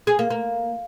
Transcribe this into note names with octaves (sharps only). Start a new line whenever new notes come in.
G#4
A#3
A#3